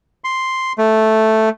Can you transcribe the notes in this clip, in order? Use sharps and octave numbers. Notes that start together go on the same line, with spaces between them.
C6
A3